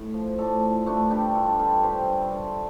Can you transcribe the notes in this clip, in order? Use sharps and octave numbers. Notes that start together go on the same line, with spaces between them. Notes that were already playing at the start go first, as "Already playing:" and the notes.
Already playing: A2
F3
A2 A4 D5
F3
G2 A3 D4
G3 D4 G4
G2 F4 A4
G3 F4 A4
G2 G4 C5
G2
G2 A4 D5